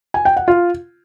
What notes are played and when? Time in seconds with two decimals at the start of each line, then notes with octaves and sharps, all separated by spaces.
0.14 G#5
0.25 G5
0.37 F#5
0.48 F4